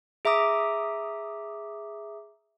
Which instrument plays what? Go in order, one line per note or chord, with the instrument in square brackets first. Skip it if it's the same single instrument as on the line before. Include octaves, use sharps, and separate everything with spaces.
[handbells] G#4 E5 A#5 D6 D#6